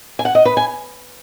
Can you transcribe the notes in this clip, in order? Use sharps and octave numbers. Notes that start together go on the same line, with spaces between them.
G#5
F#5
D#5
B4
G#5